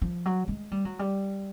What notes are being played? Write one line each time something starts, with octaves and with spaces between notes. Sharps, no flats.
F3
F#3
G#3
G3
F#3
G3